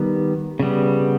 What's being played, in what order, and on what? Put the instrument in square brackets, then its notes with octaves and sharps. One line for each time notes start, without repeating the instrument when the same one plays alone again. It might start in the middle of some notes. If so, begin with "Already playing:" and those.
Already playing: [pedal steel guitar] D#3 G3 B3
C#3 G3 B3